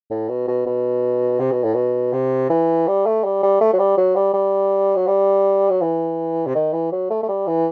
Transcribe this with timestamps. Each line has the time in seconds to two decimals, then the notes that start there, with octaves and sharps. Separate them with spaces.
0.11 A2
0.29 B2
0.48 B2
0.66 B2
1.40 C3
1.52 B2
1.64 A2
1.74 B2
2.13 C3
2.50 E3
2.88 G3
3.06 A3
3.24 G3
3.43 G3
3.61 A3
3.73 F#3
3.79 G3
3.98 F#3
4.16 G3
4.34 G3
4.96 F#3
5.07 G3
5.70 F#3
5.81 E3
6.47 C3
6.55 D#3
6.73 E3
6.92 F#3
7.10 A3
7.23 A3
7.29 G3
7.47 E3